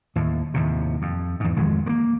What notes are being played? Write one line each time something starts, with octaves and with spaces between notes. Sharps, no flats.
D#2 A2
D#2 A2 C3
F2
E2 G#2
G#1 F2 D#3 G#3
G#3 A#3